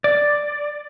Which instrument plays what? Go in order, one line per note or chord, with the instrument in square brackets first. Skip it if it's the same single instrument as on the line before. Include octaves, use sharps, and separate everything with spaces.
[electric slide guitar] D5